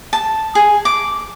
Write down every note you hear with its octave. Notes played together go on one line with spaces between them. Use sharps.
A5
G#4
D6